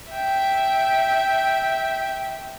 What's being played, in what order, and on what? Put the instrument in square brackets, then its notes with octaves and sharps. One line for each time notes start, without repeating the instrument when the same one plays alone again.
[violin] E5 G5